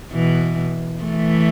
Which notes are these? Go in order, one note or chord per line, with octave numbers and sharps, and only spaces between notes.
B2 E3
E3 A3